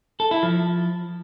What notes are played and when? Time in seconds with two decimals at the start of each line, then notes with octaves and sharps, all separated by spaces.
0.20 A4
0.31 E4
0.43 F3